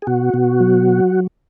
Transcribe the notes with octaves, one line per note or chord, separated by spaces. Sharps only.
G#4
B2 F#4
B2
F#3